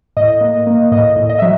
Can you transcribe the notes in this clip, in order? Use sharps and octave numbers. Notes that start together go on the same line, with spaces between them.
A2 D#5
A#3
A#3
A2 D#5
A2
D#5
F#3 E5